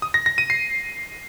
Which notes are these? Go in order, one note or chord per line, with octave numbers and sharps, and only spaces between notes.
D#6
A#6
A#6
D#7
C7